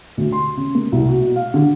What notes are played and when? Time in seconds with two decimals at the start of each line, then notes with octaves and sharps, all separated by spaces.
0.17 D2
0.32 C6
0.57 C#3
0.75 A#3
0.92 C2
1.08 F#4
1.23 B2
1.36 F5
1.54 D3